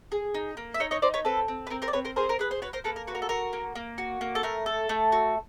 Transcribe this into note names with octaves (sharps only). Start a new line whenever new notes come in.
G#4
D#4
A#3
E5
D#4 C#5 D#5
C#5 D#5
D#4 C5 D5
B4 C#5
C4 A4 B4
C4
B4
C4 A#4
A#4 C5
D5
C4 B4 C#5
A#4 C5
G#4 A#4 C5
A#4
G#4 B4
C5
F#4 B4 C#5
A#4 C5
A#3 A4 B4
A#4
F#4 B4
A#4
A4
F#4 A#4
A#3
A#3
F#4
A#3
A4
A3 A#4
A4
A3
F#4